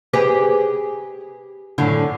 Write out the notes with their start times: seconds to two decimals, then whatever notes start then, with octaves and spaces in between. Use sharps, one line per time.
0.13 G4 G#4 B4
1.78 F#2 A2 D3